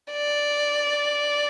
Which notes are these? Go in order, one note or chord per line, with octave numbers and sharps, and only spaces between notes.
D5